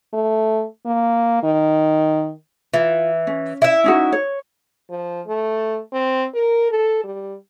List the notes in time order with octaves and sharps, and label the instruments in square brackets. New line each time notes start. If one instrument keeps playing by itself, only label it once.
[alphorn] A3
A#3
D#3
[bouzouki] E3 [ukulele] F4
[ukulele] C#4
[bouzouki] E4 E5
[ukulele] C#4 D#4 F#4
C#5
[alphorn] F3
A3
C4
A#4
A4
G3